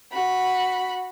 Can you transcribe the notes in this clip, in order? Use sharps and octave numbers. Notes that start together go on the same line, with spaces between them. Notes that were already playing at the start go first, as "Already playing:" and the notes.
F#4 B5